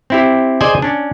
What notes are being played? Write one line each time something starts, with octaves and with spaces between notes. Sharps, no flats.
C4 E4 G4
G#4 C5 D5 D#5 G#5
C#4 D4